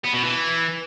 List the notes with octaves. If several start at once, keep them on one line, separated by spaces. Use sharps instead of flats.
B3
B2
E3